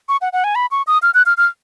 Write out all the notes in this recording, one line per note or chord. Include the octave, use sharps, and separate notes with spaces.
C#6
F#5
F#5
G#5
B5
C#6
D#6
F6
F#6
F6
F6